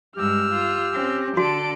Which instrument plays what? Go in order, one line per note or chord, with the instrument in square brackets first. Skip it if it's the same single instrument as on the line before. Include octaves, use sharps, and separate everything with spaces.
[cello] G2 G#3 [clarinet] G4 [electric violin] E6 F6
[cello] F4
C4 C#4
[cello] D3 A4 [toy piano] F#4 [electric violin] D5 D7